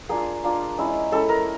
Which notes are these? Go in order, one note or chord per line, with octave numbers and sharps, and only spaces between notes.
A#3 D4 F4 G#4
A#3 D4 F4
G#3 C#4 E4
G#3 C#4 E4 A4
A#4